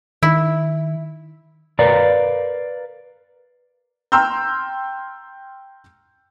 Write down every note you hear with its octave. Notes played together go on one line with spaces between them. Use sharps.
D#3 E4
A#4 B4 D5 F5 A#5
G5 A#5 C6 E6 F6 G6